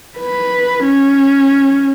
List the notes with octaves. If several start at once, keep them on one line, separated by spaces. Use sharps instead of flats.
B4
C#4